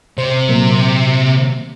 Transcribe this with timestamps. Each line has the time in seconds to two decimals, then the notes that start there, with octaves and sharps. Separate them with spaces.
0.18 C3 C5
0.48 A#2 F#3 A#3